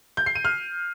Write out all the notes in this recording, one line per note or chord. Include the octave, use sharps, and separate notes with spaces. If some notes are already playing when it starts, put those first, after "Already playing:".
G6
C7
D#7
F6